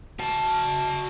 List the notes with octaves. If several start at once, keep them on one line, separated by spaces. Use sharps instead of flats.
F#4 A5